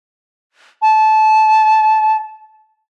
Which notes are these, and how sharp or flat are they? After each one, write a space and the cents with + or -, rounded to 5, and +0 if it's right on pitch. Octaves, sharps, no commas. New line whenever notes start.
A5 -20